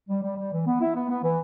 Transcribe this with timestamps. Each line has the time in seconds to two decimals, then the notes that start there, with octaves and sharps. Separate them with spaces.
0.09 G3
0.23 G3
0.37 G3
0.52 E3
0.65 B3
0.80 E4
0.95 B3
1.09 B3
1.23 E3